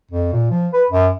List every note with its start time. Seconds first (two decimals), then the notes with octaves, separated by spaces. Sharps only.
0.12 F2
0.32 A#2
0.50 F3
0.73 B4
0.90 F#2